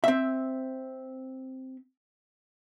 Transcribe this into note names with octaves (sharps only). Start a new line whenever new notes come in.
C4 E5